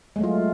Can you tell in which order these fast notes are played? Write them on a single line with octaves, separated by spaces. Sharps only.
G#3 A3 F#3 F4